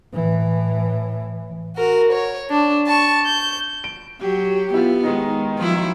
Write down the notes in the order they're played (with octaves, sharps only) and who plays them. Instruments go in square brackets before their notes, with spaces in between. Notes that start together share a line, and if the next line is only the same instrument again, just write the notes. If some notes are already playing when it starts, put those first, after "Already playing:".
[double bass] A2 E3
[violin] F#4 A#4
C#5
D4
A5 C#6
G6
[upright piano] D7
[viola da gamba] F#3 [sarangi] G4
[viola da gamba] B3 [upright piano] E4 F4
[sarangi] D#3 [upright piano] G#3 D#4
[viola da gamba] F3 F#3 E4